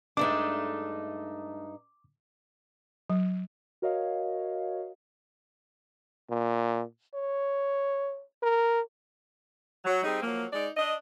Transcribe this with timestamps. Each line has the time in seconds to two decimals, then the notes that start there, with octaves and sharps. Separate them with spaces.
0.17 G2 G#3 A3 D4 D#4 D6
3.10 F#3
3.82 F#4 A#4 C#5 D#5 F5
6.30 A#2
7.14 C#5
8.43 A#4
9.85 F#3
10.04 G3 C4 D#4 G#4
10.22 F3 F#3 A#3
10.52 G#3 D#4 D5
10.77 D4 D#5